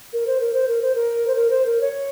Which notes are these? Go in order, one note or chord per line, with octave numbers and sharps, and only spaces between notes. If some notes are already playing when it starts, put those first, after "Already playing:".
A#4
C5
A#4
C5
A#4
C5
A#4
C5
A#4
C5
A#4
C#5